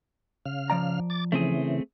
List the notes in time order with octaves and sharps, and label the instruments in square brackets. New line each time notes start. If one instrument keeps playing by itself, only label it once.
[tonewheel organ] C#3 F5 F6
[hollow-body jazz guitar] F3 D5 A#5
[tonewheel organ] D6 A6
[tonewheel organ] C#3 E3 [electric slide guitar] A3 C4 G#4